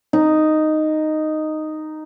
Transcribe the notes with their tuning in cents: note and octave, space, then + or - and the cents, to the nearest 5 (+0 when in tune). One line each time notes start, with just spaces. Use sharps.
D#4 -5